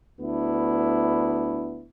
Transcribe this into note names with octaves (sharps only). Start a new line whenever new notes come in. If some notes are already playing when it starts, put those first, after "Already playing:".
D2 B3 D4 E4